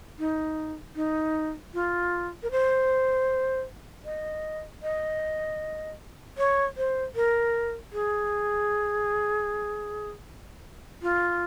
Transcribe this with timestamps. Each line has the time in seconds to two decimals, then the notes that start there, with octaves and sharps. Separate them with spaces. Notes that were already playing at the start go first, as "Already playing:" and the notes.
0.19 D#4
0.96 D#4
1.74 F4
2.43 A#4
2.51 C5
4.05 D#5
4.83 D#5
6.38 C#5
6.77 C5
7.16 A#4
7.93 G#4
11.02 F4